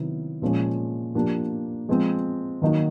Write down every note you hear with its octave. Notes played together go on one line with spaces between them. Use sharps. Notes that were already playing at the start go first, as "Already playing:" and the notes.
Already playing: C3 D#3 F#3 B3 E4
A#2 F3 G#3 C#4
F3 A#3 D4 G4
F3 G#3 C4
D#3 F#3 A#3 D#4 F#4